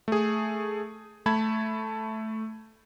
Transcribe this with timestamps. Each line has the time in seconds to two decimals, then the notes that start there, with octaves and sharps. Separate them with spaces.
0.08 A3 G#4
1.26 A3 A5 B5 G#6